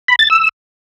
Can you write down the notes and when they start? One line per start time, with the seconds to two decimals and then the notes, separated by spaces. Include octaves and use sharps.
0.08 B5
0.19 A6
0.30 E6